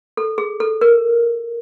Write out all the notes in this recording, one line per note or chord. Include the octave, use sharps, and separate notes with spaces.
A4
G#4
A4
A#4